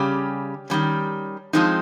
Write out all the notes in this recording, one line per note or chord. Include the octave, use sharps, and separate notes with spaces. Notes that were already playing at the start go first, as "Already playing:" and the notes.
Already playing: C#3 G3 C#4 G4
D#3 G3 C#4
F3 G#3 C4 D#4